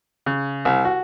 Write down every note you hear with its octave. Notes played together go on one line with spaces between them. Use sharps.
C#3
C2
F#4